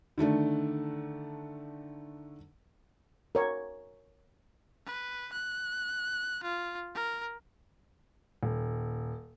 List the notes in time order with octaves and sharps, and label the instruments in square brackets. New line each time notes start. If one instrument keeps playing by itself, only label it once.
[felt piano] D3 D#3 A3 D4
[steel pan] A#4 C#5
[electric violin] B4
F#6
F4
A#4
[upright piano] D#1